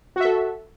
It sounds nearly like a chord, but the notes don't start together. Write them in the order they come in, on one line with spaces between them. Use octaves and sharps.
F#4 E5 A4